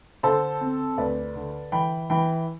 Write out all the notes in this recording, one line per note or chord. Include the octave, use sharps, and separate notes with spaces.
D3 A4 C5
C4
D2 B4 D5
D3
E3 G5 B5
E3 G5 B5